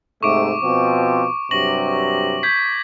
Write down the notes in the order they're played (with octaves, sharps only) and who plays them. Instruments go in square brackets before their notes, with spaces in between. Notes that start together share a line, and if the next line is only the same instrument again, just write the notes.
[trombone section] G#2 C3 A3 [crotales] C#6 D6 D7
[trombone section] B2 F3 C4
[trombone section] G2 C3 F#3 [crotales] C#6 A#6 F#7
[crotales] G6 G#6 B6